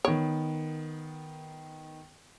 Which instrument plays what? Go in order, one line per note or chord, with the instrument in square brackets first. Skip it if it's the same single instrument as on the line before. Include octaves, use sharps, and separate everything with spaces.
[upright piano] D#3 B3 D7 [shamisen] C#5